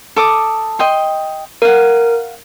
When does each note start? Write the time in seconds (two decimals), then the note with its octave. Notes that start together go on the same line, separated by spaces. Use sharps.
0.16 A4 D6 D#6
0.79 D#5 G5 C6
1.62 A#4 F5 F#5